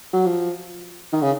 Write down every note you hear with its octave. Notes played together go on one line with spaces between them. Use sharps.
F#3
F3
D#3
C#3